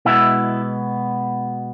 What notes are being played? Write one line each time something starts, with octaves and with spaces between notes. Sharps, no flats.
B2 G#3 B3 E4 E5